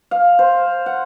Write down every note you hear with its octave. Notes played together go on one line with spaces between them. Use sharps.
F5
C5
F#5